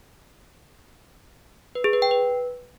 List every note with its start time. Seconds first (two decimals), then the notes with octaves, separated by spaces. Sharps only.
1.75 B4
1.84 G#4
1.93 B4
2.02 G5
2.11 B4